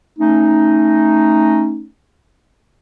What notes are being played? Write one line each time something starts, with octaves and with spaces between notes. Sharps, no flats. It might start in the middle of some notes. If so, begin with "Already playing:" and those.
A3 C#4 D#4